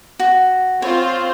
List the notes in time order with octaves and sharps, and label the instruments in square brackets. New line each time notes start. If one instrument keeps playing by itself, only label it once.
[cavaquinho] F#4
[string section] C4 F4 C5 [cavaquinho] C#5